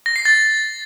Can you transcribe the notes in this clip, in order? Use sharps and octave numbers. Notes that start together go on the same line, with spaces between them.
A#6
C7
A6